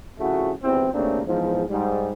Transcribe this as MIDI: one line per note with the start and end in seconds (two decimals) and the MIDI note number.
0.19 0.51 41
0.19 0.51 45
0.19 0.51 49
0.19 0.51 57
0.19 0.51 66
0.63 0.87 32
0.63 0.87 40
0.63 0.87 48
0.63 0.87 52
0.63 0.87 60
0.92 1.20 39
0.92 1.20 49
0.92 1.20 57
0.92 1.20 58
0.92 1.20 60
0.92 1.20 62
1.25 1.63 40
1.25 1.63 44
1.25 1.63 53
1.69 2.13 44
1.69 2.13 55